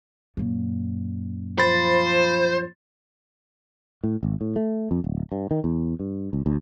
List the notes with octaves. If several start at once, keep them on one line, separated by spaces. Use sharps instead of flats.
F#2 A#2
F3 C5 B5 A6
A2
G#1
A2
A3
F2
D1
G2
D#3
E2
G2
C#2
D2